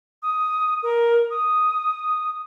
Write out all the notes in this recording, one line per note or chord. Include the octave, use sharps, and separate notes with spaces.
D#6
A#4
D#6